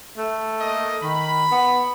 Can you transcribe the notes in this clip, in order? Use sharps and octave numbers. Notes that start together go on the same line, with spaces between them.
A3
A#3 D#5
D#3 B5
B3